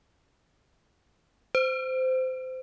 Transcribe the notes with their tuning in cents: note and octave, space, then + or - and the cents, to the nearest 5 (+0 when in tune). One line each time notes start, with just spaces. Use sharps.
C5 -20